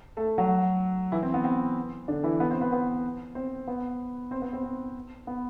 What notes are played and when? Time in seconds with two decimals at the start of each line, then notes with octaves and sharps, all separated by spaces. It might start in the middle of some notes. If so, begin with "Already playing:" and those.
0.17 A3 A4
0.38 F#3 F#4
1.12 E3 E4
1.23 C4
1.34 B3
1.44 C4
2.08 D3 D4
2.24 E3 E4
2.40 B3 B4
2.51 C4 C5
2.61 B3 B4
2.72 B3 B4
3.35 C4 C5
3.67 B3 B4
4.31 C4 C5
4.42 B3 B4
4.53 C4 C5
4.63 C4 C5
5.27 B3 B4